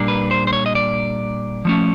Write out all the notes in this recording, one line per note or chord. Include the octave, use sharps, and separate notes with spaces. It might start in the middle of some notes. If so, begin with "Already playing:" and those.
Already playing: A#2 G3 A#3 D4
B4
C5
C5
C#5
D#5
D5
F3 A3 C#4